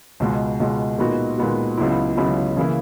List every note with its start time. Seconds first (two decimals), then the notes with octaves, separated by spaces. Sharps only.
0.20 C#2 B2 G#3
0.60 C#2 B2 G#3
0.98 A#2 G#3 B3 D#4 F#4
1.38 A#2 G#3 B3 D#4 F#4
1.78 C#2 C#3 F#3 B3 E4
2.17 C#2 C#3 F#3 B3 E4
2.57 C#3 E3 A#3 E4